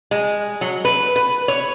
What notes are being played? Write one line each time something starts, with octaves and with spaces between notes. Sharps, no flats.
G#3
F#3
B4
B4
C#5